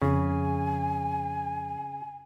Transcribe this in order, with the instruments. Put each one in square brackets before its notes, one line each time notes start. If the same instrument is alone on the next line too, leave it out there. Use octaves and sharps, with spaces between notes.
[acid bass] F2 [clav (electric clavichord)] C#3 [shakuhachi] G#5